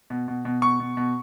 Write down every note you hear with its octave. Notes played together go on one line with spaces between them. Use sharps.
B2
B2
B2
B2 C#6
B2
B2